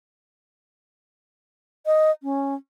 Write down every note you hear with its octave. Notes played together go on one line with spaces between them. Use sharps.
D#5
C#4